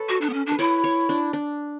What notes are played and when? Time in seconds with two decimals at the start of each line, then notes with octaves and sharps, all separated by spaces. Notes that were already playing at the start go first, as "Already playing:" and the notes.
Already playing: A4 B4 C#5
0.09 F#4
0.21 D4
0.29 B3
0.33 C#4
0.46 D4
0.52 B4
0.59 E4 C#5
0.84 C#5
1.09 D4
1.33 D4